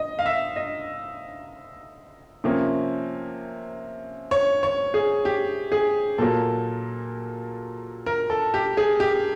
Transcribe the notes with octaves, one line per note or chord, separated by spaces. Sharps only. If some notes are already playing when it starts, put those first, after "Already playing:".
Already playing: D#5
F5
E5
D#5
C3 F3 A#3 C#4
C#5
C#5
G#4
G4
G#4
A#2 F#3 A#3 A4
A#4
A4
G4
G#4
G4